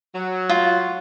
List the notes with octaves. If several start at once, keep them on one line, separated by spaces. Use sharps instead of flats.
F#3
F4